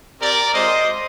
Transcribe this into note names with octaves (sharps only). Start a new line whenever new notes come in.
C4 G4 A#4 D5
G#3 C4 F4 C5 D#5